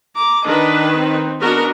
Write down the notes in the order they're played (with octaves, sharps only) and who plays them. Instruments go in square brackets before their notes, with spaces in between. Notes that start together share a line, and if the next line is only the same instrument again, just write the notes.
[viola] A#5 D6
[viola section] D#3 B4 [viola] D4 D#5
[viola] C4 D#4
[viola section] B3 F#4 A#4 [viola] D4 D#5